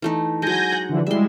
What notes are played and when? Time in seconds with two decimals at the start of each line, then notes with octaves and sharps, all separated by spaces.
0.02 E3 A3 D#4
0.42 F#3 G#3 G#5 G6 A#6
0.72 F#5
0.89 D3 E3 F3
1.07 G3 G#3 E4 E5 C6